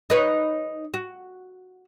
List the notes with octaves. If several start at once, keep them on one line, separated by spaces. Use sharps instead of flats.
D#4 B4 C#5
F#4